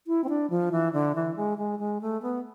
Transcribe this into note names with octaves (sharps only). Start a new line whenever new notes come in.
E4
C4
D4
F3
E3
D3
E3
G#3
G#3
G#3
A3
B3